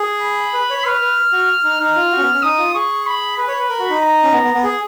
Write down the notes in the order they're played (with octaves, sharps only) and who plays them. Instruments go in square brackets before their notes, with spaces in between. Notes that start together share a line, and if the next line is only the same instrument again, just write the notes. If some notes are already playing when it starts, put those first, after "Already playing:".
Already playing: [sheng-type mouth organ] G#4
[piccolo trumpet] B5
[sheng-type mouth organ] B4
C#5
[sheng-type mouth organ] B4 [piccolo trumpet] F6
[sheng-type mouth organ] B4
F#4
D#4
[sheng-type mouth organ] D#4 [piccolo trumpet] F6
[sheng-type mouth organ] F4
F#4
C#4
B3
C#4
[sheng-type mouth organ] D#4 [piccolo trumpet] D#6
[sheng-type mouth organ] F4
[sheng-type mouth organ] G#4 [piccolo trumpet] C#6
[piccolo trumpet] B5
[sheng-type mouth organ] B4 [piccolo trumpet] B5
[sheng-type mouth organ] C#5
B4
A#4
F#4
D#4
[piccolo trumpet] A#5
[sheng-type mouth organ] C#4
B3
B3
B3
G#4